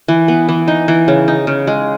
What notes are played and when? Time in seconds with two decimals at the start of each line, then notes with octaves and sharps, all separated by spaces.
0.08 E3
0.28 B3
0.49 E3
0.68 D#4
0.88 E3
1.08 C#3
1.28 D#4
1.47 C#3
1.67 G#3